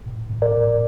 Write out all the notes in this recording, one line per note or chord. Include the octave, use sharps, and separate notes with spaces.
A2
A2
A#4 D5
A2